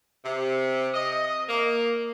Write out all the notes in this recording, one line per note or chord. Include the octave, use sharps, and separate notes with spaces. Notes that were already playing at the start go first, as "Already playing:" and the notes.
C3
D#5
A#3